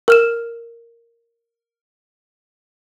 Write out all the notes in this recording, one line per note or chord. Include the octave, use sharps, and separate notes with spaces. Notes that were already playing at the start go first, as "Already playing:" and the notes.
A#4 F6 E7